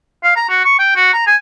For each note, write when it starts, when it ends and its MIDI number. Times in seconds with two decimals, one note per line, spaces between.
0.24 0.31 77
0.36 0.48 82
0.49 0.62 66
0.65 0.77 85
0.79 0.95 79
0.96 1.11 66
1.13 1.25 82
1.27 1.36 80